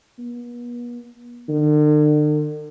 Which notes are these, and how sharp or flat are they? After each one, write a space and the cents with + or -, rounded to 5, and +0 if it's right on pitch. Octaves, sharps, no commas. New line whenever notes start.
B3 -40
D3 +45